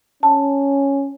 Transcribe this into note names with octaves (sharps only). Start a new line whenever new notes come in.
C#4 A5